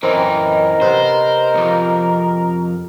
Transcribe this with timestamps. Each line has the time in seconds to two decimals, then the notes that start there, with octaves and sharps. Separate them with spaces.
0.03 F#2 E3 C4 A#4 D#5
0.82 C3 B3 C5
1.54 B1 F2